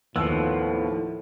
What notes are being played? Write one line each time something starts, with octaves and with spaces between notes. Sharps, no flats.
D#2 A2 F3 B3 E6